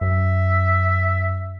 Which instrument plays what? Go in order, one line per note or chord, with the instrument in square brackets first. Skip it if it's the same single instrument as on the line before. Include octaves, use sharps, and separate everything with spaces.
[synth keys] F#2 [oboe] E5